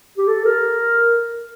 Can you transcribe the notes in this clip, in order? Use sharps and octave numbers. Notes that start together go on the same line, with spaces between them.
G4
A4
A#4